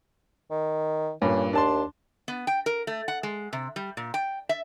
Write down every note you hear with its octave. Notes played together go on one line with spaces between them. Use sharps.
D#3
G2 A#2 C#4
D#2 D4 A5 C6
B3
G5
A#4
A3
F#5
G#3
C3
G3
A#2
G5
E5